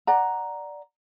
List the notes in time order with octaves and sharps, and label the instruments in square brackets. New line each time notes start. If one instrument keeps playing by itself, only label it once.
[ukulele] D5 F#5 A#5